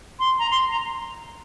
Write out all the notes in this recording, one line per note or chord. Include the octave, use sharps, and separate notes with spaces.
C6
A#5
C6
A#5